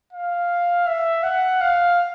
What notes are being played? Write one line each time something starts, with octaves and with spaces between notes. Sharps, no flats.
F5
E5
F#5
F5